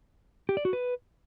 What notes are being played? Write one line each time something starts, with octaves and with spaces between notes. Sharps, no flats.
G4
D5
F#4
B4